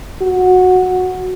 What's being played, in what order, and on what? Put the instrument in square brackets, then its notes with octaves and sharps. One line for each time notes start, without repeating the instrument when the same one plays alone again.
[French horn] F#4